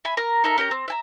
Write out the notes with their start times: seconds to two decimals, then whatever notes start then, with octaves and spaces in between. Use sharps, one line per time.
0.05 E5 G#5 B5
0.17 A#4 A#5
0.44 D#4 A4 A#4 E5
0.58 C#4 G4 A#4 A#5
0.71 C4
0.88 E5 G#5 A#5